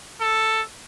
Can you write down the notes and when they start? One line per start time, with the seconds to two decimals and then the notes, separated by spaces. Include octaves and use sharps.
0.21 A4